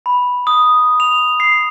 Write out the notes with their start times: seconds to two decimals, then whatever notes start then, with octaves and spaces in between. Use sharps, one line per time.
0.06 B5
0.47 D#6
1.00 F7
1.40 C7